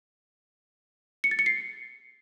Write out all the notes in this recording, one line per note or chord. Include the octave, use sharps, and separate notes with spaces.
C#7
A6
C#7
C7